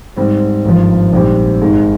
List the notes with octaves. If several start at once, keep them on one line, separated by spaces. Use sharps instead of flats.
G#2 G3 C4
G#1 G2 F3
A#1 G#2 G3 C4 G4
G#1 G#2 D#3 G#3